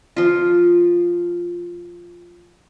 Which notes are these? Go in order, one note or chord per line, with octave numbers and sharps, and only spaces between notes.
F3 F4